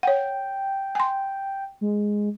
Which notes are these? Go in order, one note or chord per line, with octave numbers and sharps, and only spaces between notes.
C#5 F#5 G5
G#5 C6
G#3